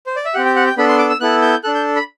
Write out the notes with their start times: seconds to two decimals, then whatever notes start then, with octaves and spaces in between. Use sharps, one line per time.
0.07 C5
0.16 D5
0.25 E5
0.34 C4 G4 F#5
0.45 G5
0.56 F#5
0.67 G5
0.77 B3 D4 A4 B5
0.89 C6
0.99 D6
1.10 E6
1.21 B3 E4 A4 F#6
1.42 G6
1.64 D4 A4 F#6
1.75 G6
1.96 B5